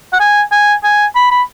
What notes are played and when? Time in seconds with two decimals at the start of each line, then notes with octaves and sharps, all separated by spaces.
0.13 F#5
0.20 G#5
0.52 G#5
0.84 G#5
1.15 B5
1.31 B5